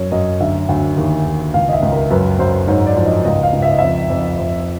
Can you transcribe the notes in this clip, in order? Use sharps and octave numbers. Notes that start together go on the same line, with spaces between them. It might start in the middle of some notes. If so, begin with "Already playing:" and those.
Already playing: F#2 C#5
F#2 D#5
D2 E5
D2
D#2
D#2
C#2 F5
D#5
E5
C#2
A#4
F#2 B4
F#2 C5
G#2 C#5
D5
F3
D#5
C#2 D#5
F5
C#2
E5
D#5
F2 E5
F2
F2